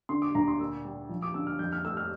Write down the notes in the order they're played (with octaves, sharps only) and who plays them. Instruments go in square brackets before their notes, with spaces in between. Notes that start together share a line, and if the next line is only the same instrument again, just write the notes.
[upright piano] D3 C6
D6
D2 A#5
C6
A#2 E6
G3
F3
D6
D3 E6
F6
F2 G6
F6
A3 E6
F6